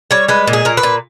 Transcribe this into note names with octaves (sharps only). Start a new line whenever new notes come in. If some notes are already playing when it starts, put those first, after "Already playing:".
G3 C#5
G#3 B4
A#2
G#4
A#2 A#4
B4
A#2